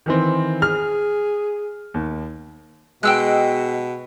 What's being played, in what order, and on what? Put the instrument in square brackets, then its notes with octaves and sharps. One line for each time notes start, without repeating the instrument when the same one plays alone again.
[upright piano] D#3 E3 C4
[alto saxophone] G#4 [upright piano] F6
[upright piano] D#2
[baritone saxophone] B2 [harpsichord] G#3 [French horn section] D#5 [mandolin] G5 E6 F#6